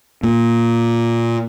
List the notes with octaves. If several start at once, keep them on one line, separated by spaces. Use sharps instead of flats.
A#2